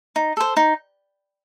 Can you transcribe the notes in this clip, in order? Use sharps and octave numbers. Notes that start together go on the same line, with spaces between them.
D#4
A4 C5
D#4